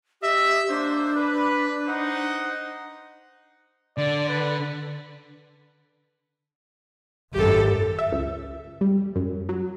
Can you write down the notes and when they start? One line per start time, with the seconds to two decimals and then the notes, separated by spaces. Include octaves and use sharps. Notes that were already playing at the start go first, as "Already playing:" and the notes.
0.22 G4 D#5 E5
0.69 A#3 D4 C5
1.16 B4
1.87 D#4 C5 F#5
3.98 D3 D5
4.29 B4
7.33 G#1 F#2 G4 A4
7.99 E5
8.12 C#2
8.81 G3
9.16 F#2
9.49 F#3